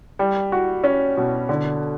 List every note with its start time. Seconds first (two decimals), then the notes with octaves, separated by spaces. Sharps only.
0.19 G3
0.52 F#4
0.84 C#4
1.17 B2
1.49 D3